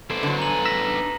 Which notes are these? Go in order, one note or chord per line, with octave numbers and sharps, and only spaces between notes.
B3 E4 A4 C5 D5
D3 F#3
G#5 A#5 F#7
D4 D#4 E6 A#6 B6